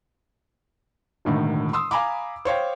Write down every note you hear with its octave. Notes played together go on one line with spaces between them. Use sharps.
E1 A2 D3 D#3
C6 D#6 E6
F5 G#5 A#5 B5 D6
C5 C#5 F5 G5